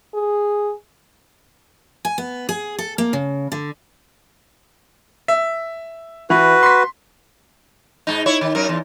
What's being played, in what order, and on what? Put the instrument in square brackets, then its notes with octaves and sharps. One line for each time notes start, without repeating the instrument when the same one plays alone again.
[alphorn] G#4
[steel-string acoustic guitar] G#5
B3
G#4
A4
A#3
C#3
D3
[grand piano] E5
[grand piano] E3 [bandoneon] F#4 B4
[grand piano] C6 B6
[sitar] G#2 D#4
E4 C#5
D#3
F#2 A#4
E2